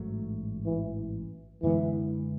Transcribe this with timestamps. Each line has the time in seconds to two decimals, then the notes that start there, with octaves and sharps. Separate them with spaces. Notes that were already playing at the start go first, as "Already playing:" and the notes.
Already playing: A1 G#2 F#3 A3
0.65 E3
1.63 F#2 D3 E3 G#3 B3